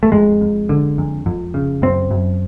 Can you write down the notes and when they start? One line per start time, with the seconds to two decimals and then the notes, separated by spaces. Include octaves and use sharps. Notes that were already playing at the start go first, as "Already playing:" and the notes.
0.03 A3
0.12 F2 G#3
0.41 F2
0.69 D3
0.98 F2
1.26 F2
1.54 C#3
1.82 F#2 C4
2.11 F#2